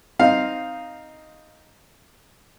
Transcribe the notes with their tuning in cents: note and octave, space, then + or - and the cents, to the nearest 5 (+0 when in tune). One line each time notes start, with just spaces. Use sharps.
C4 +0 D#4 +0 F5 +0